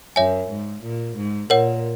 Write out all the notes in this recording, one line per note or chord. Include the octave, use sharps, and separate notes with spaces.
F#2 C#5 E5 G#5
G#2
A#2
G#2
A#2 A#4 C#5 F#5